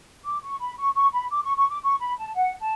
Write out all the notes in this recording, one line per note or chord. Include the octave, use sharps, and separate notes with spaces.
D6
C#6
B5
C#6
C#6
B5
D6
C#6
C#6
D6
C#6
B5
A5
F#5
A5